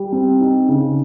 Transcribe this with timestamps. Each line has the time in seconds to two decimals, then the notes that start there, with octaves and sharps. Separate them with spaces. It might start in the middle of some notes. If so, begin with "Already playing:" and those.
Already playing: G3
0.13 C4
0.41 D#4
0.69 C#3